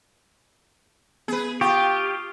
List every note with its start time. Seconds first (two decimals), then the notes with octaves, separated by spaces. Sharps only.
1.28 B3 G#4 B4
1.61 F4 G4 C#6 D#6